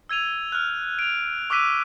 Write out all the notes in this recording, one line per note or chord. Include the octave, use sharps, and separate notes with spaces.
E6 G#6 D#7 F7
F6 F#6
D7 F7
C#6 D6 E6 F#6 B6 D#7